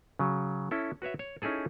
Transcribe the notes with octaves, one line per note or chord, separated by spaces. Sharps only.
C#3 F#3
C#4 E4 A4
F#4 B4 C#5 E5
C#5
C#4 D#4 E4 G#4 A4